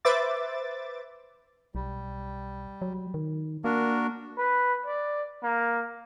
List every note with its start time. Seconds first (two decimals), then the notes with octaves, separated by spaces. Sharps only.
0.05 B4 C5 E5 D6 A6
1.75 B1 G3
2.82 F#3
3.14 D#3
3.64 A#3 D4 F#4 A#4
4.38 B4
4.86 D5
5.43 A#3